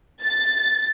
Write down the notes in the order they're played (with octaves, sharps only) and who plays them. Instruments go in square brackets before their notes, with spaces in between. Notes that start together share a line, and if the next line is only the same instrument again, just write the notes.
[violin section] A6